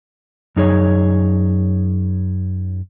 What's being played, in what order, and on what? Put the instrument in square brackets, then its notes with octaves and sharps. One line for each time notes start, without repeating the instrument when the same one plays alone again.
[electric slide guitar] F#2 D#4 G#4 C#5